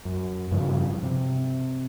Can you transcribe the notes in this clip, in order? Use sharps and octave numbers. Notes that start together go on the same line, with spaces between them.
F#2
G2 C#3 F3
C3